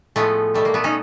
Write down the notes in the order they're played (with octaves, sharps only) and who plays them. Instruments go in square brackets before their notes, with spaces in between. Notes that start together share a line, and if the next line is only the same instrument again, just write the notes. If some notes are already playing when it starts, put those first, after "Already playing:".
[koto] A2 F3 G#3 A3 B3
B2 G3 A3
A#3
A3 B3
C#4 D#4